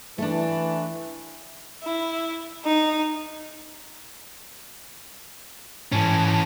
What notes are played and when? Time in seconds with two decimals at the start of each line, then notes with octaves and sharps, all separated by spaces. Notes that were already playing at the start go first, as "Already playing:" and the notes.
0.18 E3 A3 D4
1.82 E4
2.64 D#4
5.92 G#2 E3 C#4 A5